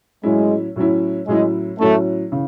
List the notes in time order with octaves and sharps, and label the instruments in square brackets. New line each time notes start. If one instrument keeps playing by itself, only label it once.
[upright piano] A2 F#3 C#4 E4 [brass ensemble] G#3
[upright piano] A2 F#3 C#4 E4
[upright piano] A2 F#3 C#4 E4 [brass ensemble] G#3
[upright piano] A2 F#3 C#4 E4 [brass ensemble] A3
[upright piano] C#3 E3